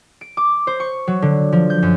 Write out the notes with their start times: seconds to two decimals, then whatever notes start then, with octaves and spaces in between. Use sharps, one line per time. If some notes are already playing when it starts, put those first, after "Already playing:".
0.21 D7
0.37 D6
0.67 C5
0.80 C#6
1.07 F#3
1.22 D3
1.52 F3
1.70 G6
1.82 F#2